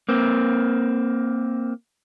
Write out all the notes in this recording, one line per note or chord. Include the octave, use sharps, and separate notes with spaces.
A#3 C4